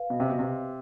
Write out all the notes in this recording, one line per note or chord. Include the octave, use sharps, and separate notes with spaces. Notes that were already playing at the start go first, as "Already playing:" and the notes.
Already playing: B4 F5
B2
C3
B2
C3